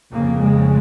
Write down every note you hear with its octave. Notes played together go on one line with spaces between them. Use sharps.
F2 C#3 A#3
G#3